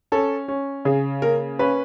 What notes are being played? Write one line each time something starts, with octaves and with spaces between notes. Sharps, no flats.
C#4 A4
C#4
C#3 G#4
A#3 A#4
C#4 B4